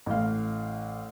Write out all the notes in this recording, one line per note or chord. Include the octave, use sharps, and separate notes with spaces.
A1 F5